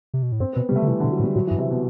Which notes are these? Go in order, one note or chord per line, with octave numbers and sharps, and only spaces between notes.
C3
B2
A2
G2 C4
B3
B2
G3
C3
A3
D3
C3 E3
D3
B2
F#3
A2
G3
A2 F#3
E3
G2
C3
B2